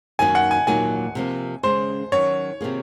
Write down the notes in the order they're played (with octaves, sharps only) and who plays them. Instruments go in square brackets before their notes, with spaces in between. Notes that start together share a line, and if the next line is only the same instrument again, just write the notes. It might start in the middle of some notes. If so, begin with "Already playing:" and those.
[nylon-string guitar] F#2 D#3 A#3 D#4 F#4 [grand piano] G#5
[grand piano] F#5
G#5
[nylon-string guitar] A#2 F#3 A#3 D#4 [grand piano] G#5
[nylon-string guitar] C3 F3 A#3
[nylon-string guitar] C#3 G#3 C#4 [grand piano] C5
[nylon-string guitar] D#3 F#3 C#4 F#4 [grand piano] C#5
[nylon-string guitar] C3 D#3 A#3 F4 G#4